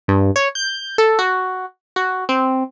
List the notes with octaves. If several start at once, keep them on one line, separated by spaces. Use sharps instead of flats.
G2
C#5
G6
A4
F#4
F#4
C4